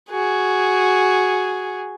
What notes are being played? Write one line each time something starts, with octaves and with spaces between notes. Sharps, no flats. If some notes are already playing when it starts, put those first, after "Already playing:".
F#4 G#4